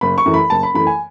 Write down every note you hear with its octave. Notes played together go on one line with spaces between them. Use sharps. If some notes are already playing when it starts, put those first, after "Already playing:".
F#1 B5
C#6
F#2 E3 A3
B5
F#1 A5
B5
F#2 E3 A3 B5
G#5